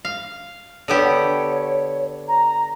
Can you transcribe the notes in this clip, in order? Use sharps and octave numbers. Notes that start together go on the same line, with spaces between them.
F5
D3 B3 G4 C#5
A#5